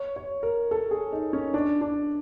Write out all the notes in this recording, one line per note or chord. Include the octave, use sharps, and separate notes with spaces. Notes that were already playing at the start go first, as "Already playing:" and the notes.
Already playing: C#5
C#5
A#4
A4
G#4
D#4
C#4
D4
D4